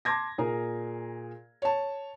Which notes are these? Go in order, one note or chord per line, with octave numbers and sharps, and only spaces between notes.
A5 C6 D6 G#6 A#6
A#2 G#4 A#4 A#5
C#5 A5